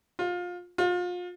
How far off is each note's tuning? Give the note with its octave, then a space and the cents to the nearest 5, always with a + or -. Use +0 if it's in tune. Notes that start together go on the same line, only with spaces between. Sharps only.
F4 +25
F4 +35